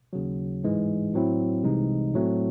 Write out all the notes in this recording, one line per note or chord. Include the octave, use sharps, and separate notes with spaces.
D#2 C#3 F#3
A1 G#2 E3 G#3
A2 F#3 C4 E4
C2 C3 E3 G#3 D#4
A2 F#3 A3 C4